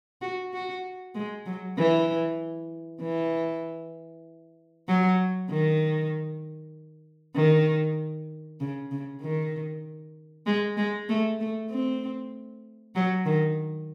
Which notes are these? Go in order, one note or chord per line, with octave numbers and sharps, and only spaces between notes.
F#4
F#4
G#3
F#3
E3
E3
F#3
D#3
D#3
C#3
C#3
D#3
G#3
G#3
A3
A3
C4
F#3
D#3